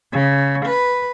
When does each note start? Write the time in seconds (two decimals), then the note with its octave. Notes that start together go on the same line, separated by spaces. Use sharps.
0.12 C#3
0.65 B4